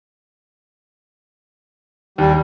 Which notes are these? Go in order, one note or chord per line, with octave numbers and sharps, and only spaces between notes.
D#2 G3